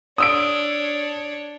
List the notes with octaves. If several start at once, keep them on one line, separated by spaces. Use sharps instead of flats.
D4 C#5 D#6 E6 D7